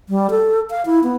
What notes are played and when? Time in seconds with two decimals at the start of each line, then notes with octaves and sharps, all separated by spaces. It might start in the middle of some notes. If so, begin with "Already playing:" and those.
0.09 G3
0.30 A4
0.70 F5
0.86 E4
1.03 B3